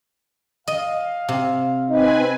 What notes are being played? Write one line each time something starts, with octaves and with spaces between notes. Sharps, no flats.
D#5 F5
C3
C4 D#4 B4 G#5